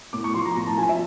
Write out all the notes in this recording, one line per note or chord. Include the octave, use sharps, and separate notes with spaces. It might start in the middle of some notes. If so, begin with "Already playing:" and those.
A2 D6
C#6
F3 C6
A#5
A2 A#5
A5
F3 G#5
E5